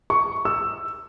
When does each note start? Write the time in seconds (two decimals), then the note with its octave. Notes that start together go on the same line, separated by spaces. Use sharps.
0.10 C#6
0.45 E6